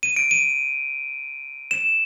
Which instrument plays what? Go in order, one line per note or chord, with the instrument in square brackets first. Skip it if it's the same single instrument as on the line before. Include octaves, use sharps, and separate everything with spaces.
[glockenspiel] D#7
D7
D#7
E7